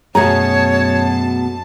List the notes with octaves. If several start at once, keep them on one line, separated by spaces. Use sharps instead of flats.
F#2 B2 A3 G#4 C#5 A5 A#5